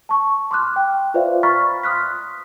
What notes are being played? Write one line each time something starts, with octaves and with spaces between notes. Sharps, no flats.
A5 C#6
C6 D6 F6 F#6
G5
F4 B4 C5 D5 E5 F5
A#5 B5 C#6 F6 A6 B6
C6 D#6 F6 F#6 B6